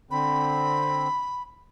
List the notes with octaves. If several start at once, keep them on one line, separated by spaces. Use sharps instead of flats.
D3 C4 B5